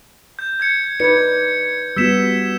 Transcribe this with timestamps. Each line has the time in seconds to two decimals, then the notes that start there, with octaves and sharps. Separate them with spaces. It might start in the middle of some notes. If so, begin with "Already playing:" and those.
0.39 G6
0.60 G6 G#6 C#7
1.00 D#4 B4 D5 G#6 C#7
1.97 G3 B3 F#4 E6 B6 E7